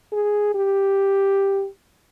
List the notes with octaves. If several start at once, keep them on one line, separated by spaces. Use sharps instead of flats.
G#4
G4